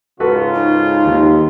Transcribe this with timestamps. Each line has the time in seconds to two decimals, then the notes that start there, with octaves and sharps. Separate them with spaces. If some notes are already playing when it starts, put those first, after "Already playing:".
0.20 G#2 C#3 F4 F#4 A4 B4
0.55 D#4
1.05 D#2